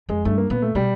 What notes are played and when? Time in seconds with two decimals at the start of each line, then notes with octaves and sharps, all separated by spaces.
0.09 F2 G#3
0.25 G2 A3
0.38 A#3
0.50 A#2 B3
0.62 A3
0.75 B2 G3